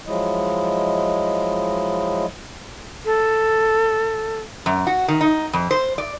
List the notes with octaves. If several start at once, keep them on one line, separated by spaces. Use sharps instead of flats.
F3 F#3 G#3 E4 D#5
A4
F#2
F#4
D#3
D#4
F2
C5
D5